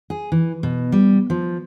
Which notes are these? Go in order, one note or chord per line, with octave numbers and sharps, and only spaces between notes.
G#4
E3
B2
G3
F3